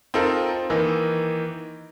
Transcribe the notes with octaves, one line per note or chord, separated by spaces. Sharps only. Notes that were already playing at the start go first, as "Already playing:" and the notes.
C4 D#4 F4 A4 A#4
D#3 E3 A#3 D#4